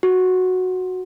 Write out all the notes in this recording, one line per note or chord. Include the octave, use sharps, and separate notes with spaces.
F#4